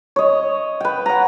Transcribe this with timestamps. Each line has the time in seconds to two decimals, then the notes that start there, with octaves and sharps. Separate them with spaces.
0.16 C#5 D#5
0.80 B4 G5
1.06 F#5 A#5